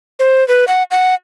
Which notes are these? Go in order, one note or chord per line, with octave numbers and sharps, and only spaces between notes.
C5
B4
F#5
F#5